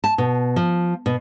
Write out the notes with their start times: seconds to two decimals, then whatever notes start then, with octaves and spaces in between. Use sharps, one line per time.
0.04 A5
0.18 B2
0.56 F3
1.06 B2